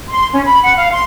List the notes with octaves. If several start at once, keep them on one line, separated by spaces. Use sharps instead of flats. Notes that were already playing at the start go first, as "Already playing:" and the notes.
C6
C#4
B5
F#5
F5
C6